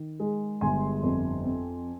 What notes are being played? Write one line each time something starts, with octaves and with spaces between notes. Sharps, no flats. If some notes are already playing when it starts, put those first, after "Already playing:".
Already playing: D#3
G#3
G1 G#5 C6
F2
C4